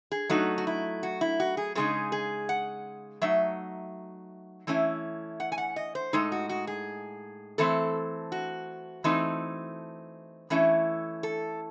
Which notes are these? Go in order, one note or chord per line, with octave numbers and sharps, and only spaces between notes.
G#4
F#3 A3 D#4 F#4
F#4
E4
F#4
E4
F#4
G#4
C#3 G#3 D#4 G#4
G#4
F#5
F#3 A3 D#4 E5
E3 A3 C#4 E4
F#5
G#5
F#5
D#5
C5
A2 G#3 D#4 A4
F#4
F#4
G#4
E3 A3 C4 A4
F#4
E3 A3 C4 D#4
E3 A3 C#4 E4
A4